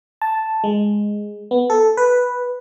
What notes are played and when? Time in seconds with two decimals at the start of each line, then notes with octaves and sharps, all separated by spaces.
0.22 A5
0.64 G#3
1.51 B3
1.70 A4
1.97 B4